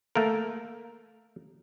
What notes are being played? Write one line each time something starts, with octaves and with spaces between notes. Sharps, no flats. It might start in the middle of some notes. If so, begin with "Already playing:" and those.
A3 A#3 A#4